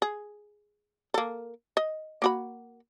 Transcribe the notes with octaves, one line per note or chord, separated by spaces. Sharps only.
G#4
A#3 A4
D#5
A#3 F#4 B5